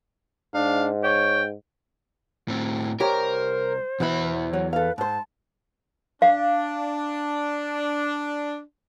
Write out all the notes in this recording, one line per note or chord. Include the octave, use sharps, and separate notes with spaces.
G#2 D4 F5
C#5 G5
A2 C4
C2 G4 A#4 C5 C#5
E2 B2 E3 E5 B5
F#3
A4 B4 F5
G#2 C5 A5
D4 F5